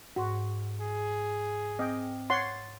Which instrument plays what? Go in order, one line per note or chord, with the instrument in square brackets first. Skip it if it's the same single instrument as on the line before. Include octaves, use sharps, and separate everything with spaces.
[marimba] G#2 C6 [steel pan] F#4
[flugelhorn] G#4
[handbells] C4 [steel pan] D#5 G5
[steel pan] C#5 F#5 C6 [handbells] A6